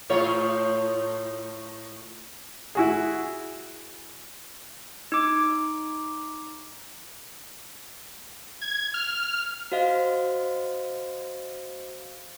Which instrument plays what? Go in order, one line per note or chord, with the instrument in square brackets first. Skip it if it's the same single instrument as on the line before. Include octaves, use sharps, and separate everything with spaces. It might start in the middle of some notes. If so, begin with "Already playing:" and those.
[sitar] A2 F4 C#5
[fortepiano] E4 F#4 G#4
[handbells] D#4 D6
[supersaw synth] G#6
F6
[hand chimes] F#4 C5 D#5 F5